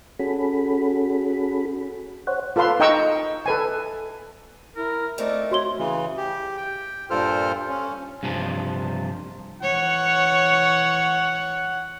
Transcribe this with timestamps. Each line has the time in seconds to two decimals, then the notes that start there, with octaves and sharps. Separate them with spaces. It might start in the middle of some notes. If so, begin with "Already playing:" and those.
0.19 C#4 F#4 G#4 A4 B5
2.27 C5 C#5 F#5
2.56 F4 A4 B4 F5 C6
2.80 D#4 D#5 G5 A#5 C#6 E6
3.46 A4 B4 G#5
4.76 E4 A#4
5.18 A3 C4 D#4 A#4 D5
5.51 F#4 C#5 C6 G7
5.79 C#3 E3
6.17 G4
6.57 G5
7.10 G2 A#2 F4 A4 C5 F6
7.69 C#4
8.23 G2 C3 F3
9.62 E3 C#5 F#5